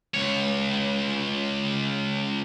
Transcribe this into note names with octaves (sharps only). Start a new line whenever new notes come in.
C#2 C#5